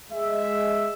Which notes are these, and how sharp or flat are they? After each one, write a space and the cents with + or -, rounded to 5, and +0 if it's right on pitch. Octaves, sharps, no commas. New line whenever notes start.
G#3 +0 E5 +0